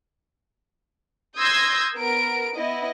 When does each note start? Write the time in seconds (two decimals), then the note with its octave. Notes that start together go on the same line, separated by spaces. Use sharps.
1.39 C6 D#6 E6 G6 G#6 A#6
1.98 B3 A#4 D7
2.56 B3 E4 D#5